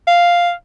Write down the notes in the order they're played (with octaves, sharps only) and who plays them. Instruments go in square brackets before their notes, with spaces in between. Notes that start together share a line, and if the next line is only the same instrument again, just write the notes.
[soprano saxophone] F5